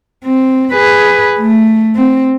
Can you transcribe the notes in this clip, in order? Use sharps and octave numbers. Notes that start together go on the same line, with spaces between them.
C4
G#4 B4
A3
C4